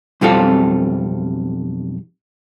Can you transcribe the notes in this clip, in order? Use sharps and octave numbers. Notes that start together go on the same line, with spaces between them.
B1 F2 G3 C4 F4 A4